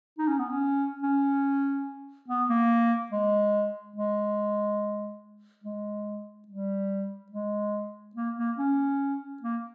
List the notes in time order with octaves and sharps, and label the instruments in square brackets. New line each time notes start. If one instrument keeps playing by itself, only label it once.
[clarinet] D#4
C#4
B3
C#4
C#4
B3
A#3
G#3
G#3
G#3
G3
G#3
A#3
A#3
C#4
A#3